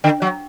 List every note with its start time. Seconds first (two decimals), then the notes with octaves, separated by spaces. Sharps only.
0.04 D3
0.22 F#3